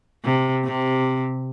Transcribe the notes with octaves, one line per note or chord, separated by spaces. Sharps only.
C3
C3